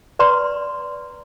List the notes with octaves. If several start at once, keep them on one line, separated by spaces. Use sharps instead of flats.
B4 D5 A#5 C6